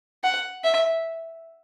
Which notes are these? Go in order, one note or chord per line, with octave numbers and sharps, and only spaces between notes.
F#5
E5